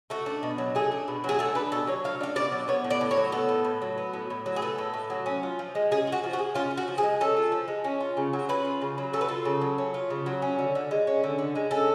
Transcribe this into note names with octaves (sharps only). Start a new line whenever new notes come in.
A3 F#4
D4
B2
F#3
A3 G#4
D4
B2
F#3
G#4
A3 A4
D4 B4
B2 A4
F#3 C#5
A3 F5
D4 F5
B2 D5
F#3
B3 C#5
A2
D5
A2
C#5
F#3
B3 A4
A2
A2
F#3
B3
A2
A2
F#3
G#4
B3 A4
A2
A2
F#3
C#4
F4
F3
G#3
C#4 G#4
F4
F#4
F3
F#4
G#3
C#4 F4
F4
F#4
F3
G#4
G#3
C#4 A4
F4
F3
G#3
C#4
F4
C#3
F#3
C#4 B4
F4
C#3
F#3
C#4 A4
B4
F4 A4
C#3
F#3
C#4
F4
C#3
F#3
C#4
D3
D3
G#3
C#4
D3
D3
G#3
C#4 A4